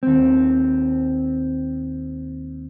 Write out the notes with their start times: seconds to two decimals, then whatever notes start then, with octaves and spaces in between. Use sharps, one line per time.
0.03 D#2 C4